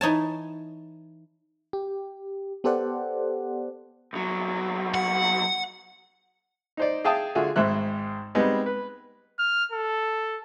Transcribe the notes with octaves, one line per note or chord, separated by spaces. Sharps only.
E3 D#4 C#5 A5
G4
B3 G4 A4 C5 D5 F#5
C2 F#3
F#5
D#4 C5 D5
G#4 E5 F5 G5 A5 D#6
D3 F4 F#4 G#4 E5
G#1 G#2 G#3 C5 E5 F#6
G3 G#3 B3 C4 D#4
B4
F6
A4